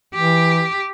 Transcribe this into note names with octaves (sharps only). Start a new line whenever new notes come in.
E3 G4